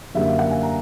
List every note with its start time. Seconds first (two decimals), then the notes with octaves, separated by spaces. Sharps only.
0.15 F#2 D3 G3 A#3 E5
0.26 F5
0.39 F#5
0.51 G#5
0.63 A#5